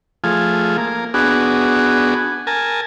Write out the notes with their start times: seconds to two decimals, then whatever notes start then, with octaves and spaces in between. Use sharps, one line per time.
0.24 F3 A3 F4 G#4
0.78 A#3
1.14 B3 D4 F#4 G#4
2.47 A#4 G#5 A5